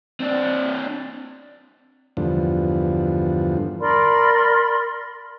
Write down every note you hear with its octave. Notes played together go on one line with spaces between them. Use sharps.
C4 D4
E2 G2 D3 F3
A#4 D5 B5 C6